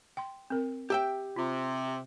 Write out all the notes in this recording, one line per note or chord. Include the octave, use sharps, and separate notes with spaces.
G5 C6
C4 A#4
G4 E5 G5
C3 F4